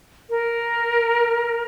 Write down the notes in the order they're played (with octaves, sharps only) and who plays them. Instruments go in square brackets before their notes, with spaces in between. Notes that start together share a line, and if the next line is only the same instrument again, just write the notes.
[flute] A#4